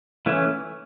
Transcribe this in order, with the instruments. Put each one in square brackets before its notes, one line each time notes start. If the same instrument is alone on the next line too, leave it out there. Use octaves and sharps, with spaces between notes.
[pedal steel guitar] E3 A3 C#4 E4